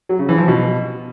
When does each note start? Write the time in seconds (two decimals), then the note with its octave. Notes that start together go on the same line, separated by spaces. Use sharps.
0.09 F#3
0.19 C#3
0.29 E3
0.38 F3
0.48 B2